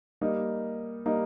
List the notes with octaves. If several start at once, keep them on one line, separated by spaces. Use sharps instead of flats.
G3 A#3 D#4
G3 A#3 D#4